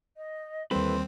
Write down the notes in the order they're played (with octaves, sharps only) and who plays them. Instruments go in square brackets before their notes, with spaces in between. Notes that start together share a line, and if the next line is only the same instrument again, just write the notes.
[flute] D#5
[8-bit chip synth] D#2 C4 [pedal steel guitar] E3 A4 B4 [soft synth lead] G3 [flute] C6